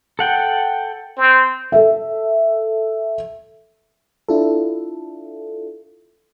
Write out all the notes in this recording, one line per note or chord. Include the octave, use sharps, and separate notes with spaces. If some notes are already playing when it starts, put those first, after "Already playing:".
A4 F#5 G5
C4
A4 E5
D4 E4 F4 A4